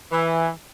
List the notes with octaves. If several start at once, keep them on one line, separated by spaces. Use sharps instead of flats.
E3